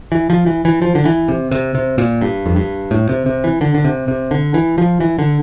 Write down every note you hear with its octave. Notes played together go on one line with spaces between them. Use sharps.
E3
F3
E3
E3
F3
D3
E3
C3
C3
C3
A#2
G2
F2
G2
A2
C3
C3
E3
D3
D3
C3
C3
D3
E3
F3
E3
D3